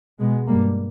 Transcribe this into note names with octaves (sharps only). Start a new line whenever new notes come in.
B2 G#3 B3
G2 G3 A#3